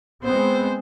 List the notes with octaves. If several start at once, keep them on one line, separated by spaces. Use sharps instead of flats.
G#3 B3 C4 C5